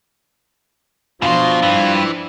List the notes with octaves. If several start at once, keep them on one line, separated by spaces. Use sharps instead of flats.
E2 B2 F3 D4 F4 C6
G2 E3